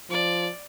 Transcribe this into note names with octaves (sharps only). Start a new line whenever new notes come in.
F3 D5